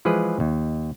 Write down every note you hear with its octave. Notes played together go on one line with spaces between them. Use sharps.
E3 F3 G#3 G#4 B4
D#2